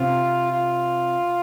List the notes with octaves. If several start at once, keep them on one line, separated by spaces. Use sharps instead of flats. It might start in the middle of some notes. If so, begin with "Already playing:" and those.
Already playing: C3 C4 F4
F4